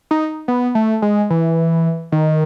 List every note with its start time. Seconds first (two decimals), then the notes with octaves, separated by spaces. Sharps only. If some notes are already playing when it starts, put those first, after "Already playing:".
0.11 D#4
0.48 B3
0.75 A3
1.02 G#3
1.30 E3
2.12 D#3